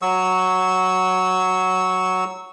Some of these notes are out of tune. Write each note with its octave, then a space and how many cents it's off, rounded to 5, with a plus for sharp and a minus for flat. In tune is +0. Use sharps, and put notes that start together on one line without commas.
F#3 +0 C#6 +0 E6 -25